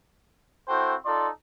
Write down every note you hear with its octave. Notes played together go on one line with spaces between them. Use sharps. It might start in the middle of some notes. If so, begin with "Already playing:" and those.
C4 E4 F#4 A4 C5 G5
D#4 F4 A4 D5 C6